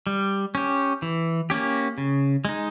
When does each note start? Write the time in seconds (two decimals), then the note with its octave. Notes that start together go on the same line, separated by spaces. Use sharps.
0.07 G3
0.55 C#4 G4
1.02 E3
1.50 A#3 C#4 G4
1.98 C#3
2.45 G#3 D#4